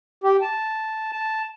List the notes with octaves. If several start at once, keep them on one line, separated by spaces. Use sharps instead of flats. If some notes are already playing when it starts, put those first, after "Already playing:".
G4
A5
A5